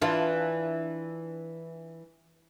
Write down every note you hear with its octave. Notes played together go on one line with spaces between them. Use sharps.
E3 D4 F4